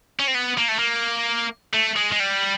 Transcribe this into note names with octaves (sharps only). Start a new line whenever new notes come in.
C#4
C4
B3
A#3
A3
A#3
A3
G#3
G#3
G3